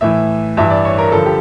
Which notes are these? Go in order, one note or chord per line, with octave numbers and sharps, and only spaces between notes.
A2 E3 E5
G2 E3 E5
D5
C#5
A#4
G2 D3 F3 A4
G4